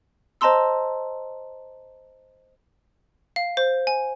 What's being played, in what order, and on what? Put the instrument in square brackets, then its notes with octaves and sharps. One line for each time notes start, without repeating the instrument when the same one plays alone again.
[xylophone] C5 D#5 A5 A#5 C6 E6
F5
C5
G#5